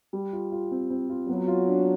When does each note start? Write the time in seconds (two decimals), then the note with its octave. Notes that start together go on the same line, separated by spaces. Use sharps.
0.13 G3
0.33 F4
0.52 F4
0.71 C4
0.90 C4
1.10 F4
1.28 F#3 B3
1.48 F4
1.67 D4